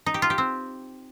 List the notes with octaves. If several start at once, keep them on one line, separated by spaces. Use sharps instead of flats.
D#4
G4
F4
G4
C4